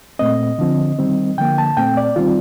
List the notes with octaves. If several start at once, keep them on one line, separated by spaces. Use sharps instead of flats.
A#2 A3 C4 D#5
D3 F3 C4
D#3 G3 C4
D3 F3 A#3 G5
A5
A#2 A3 C4 G5
D5
D#3 G3 C4 F4